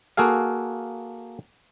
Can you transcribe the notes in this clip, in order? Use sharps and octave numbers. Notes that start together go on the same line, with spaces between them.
A#3 F#4 G#4 A4 F5